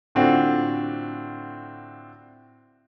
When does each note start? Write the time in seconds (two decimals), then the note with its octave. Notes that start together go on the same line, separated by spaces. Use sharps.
0.15 A2 D3 C4 D4 F4 F#4